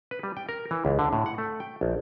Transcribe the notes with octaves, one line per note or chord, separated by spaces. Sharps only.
B4
G3
G5
A#4
E3
C#2
D3
A2
F#5
A3
G5
A#1